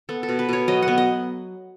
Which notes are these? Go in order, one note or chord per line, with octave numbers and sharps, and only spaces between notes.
B3 A4
A4
B2
B4
B2 C#5
F#3 D#5
F#5
B3
D#5